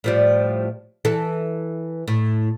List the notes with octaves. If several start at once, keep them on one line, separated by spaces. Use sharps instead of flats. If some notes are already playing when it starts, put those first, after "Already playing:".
A2 F3 G3
E3 A4
A2